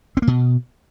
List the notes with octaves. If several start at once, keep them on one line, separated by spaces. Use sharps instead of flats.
C4
A#3
B2